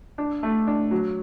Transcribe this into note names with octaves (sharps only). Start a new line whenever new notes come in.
D4
A3
D4
F#3